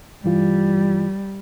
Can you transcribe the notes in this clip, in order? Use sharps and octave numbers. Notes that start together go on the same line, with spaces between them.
G2 E3 G3 F4